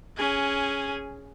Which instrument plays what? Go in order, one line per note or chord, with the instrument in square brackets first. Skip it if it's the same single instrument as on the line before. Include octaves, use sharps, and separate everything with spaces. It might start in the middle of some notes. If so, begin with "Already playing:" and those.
[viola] C#4 G#4